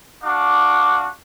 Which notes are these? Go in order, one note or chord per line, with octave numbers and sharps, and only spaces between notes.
D4 F#4 F5 D6